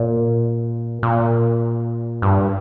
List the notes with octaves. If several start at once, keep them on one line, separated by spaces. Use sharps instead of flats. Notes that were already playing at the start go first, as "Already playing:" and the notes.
Already playing: A#2
A#2
G2